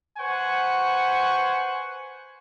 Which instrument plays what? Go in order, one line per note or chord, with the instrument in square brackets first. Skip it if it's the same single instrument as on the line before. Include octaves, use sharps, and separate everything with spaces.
[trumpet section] B4 C5 F#5 G#5 C#6